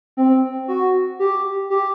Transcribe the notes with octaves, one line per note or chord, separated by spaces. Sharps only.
C4
F#4
G4
G4